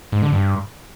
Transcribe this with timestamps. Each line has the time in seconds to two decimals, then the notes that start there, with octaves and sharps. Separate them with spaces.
0.12 G#2
0.22 D3
0.32 G2